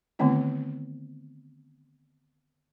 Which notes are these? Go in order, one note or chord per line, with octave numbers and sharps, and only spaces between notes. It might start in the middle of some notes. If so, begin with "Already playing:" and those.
D3 D#3 A3 B3 C4 E4